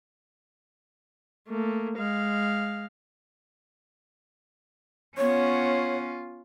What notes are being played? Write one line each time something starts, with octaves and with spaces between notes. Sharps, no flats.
A3 A#3
G#3 F5
B3 C#4 F4 C#5 F#5